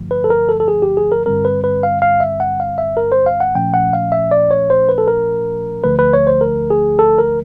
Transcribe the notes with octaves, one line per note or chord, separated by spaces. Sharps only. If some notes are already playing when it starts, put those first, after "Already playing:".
Already playing: G1 G2 D3 F3 A3
B4
A4
A#4
A4
A4
G#4
G4
G#4
A#4
G2 D3 G3 C4 A#4
B4
B4
F5
F5
E5
F#5
F5
E5
A#4
C5
F5
F#5
A#2 F3 A3 C#4 G5
F#5
F5
E5
D5
C#5
C5
B4
A4
A#4
D2 D3 F3 A3 B4
B4
C#5
C5
A#4
G#4
A4
A#4